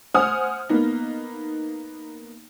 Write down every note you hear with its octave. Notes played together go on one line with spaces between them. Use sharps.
C5 F#5 G#5 D#6 F6
A#3 B3 D#4